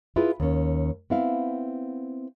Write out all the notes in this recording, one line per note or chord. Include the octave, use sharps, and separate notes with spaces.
E4 F4 G#4 B4
D#2 C#4
B3 C4 E4 E5 F5